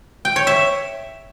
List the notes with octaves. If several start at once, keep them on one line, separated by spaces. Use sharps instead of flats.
G5
C#5
E5